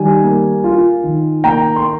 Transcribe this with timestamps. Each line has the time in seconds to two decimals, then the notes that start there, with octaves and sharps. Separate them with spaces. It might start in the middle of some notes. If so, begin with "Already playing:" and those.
Already playing: D#3 G3 G#5
0.24 A#3
0.64 F4
1.03 D#3
1.44 A#3 G5 A#5
1.76 C6